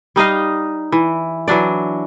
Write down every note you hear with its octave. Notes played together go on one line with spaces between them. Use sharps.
G3 D#4 D#5 F5
E3
E3 F#3 D4 D5